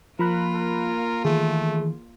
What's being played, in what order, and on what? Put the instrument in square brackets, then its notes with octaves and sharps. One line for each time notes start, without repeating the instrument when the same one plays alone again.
[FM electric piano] F3 B5 F#6 [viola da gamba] A#3 F4 [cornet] A#4
[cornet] A#4
[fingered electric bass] D#3 E3 [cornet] A3 [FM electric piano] G#4